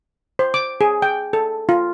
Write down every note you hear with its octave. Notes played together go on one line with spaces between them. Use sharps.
C5
D6
G#4
G5
A4
F4